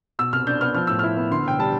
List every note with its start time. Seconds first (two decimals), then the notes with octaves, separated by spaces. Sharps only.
0.19 B2 E6
0.33 C2 F6
0.47 D4 G6
0.61 B3 F6
0.75 F3 F6
0.87 A2 E6
0.99 E4 F6
1.17 B3
1.31 D2 C6
1.45 E1 G5
1.59 G3 A5